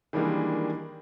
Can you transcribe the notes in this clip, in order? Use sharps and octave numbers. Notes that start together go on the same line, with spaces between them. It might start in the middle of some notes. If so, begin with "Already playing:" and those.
D#3 E3 G3 G#3 A#3 D4